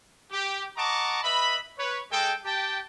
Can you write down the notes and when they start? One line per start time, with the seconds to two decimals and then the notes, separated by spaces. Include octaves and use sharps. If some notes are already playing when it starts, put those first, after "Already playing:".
0.32 G4
0.77 D#5 F#5 A5 A#5 C#6 D6
1.22 B4 D#5 E5 B5
1.78 B4 C#5
2.11 G#3 A4 G5
2.44 G4 G5 A5